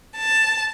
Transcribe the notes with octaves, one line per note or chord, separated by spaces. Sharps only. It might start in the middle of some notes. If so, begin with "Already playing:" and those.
A5